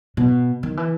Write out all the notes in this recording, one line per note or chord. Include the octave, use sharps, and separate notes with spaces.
B2
D#3
E3